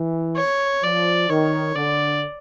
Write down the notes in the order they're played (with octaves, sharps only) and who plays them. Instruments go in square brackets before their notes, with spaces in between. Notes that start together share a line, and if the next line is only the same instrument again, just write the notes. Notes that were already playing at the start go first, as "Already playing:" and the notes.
Already playing: [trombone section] E3
[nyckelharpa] C#5
[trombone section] F3 [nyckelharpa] D5
[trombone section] D#3 [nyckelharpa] C#5
[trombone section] D3 [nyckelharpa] D5